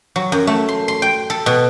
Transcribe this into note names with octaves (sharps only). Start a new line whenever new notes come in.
F#3
F#2
A3
C6
C6
G5
A4
B2